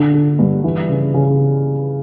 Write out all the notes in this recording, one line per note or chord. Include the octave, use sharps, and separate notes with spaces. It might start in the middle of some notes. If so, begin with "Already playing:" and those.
Already playing: D3
D3
G2
E3
C#3
C#3